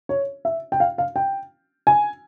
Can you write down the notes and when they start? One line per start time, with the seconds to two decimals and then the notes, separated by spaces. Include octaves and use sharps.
0.09 C#5
0.45 E5
0.72 G5
0.80 F5
0.98 F5
1.16 G5
1.87 G#5